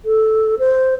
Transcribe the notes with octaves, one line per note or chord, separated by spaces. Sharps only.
A4
C5